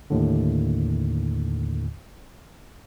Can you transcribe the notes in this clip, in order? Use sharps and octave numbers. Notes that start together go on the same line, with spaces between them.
D#2 A2 D3